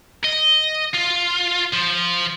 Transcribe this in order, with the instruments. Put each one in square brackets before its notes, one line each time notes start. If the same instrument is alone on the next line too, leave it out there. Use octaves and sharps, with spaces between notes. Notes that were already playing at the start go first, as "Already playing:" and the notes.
[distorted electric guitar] D#5
F4
F3